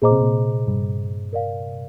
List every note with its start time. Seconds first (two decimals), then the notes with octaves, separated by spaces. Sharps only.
0.02 A#2 G#4 C5 D#5 A#5 D6
0.11 C3
0.21 A#2
0.67 G2
1.33 A#4 D5 F5